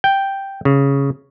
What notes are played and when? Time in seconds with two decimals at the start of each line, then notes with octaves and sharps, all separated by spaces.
0.04 G5
0.65 C#3